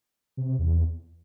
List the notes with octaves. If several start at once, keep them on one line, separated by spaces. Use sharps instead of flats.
C3
C3
E2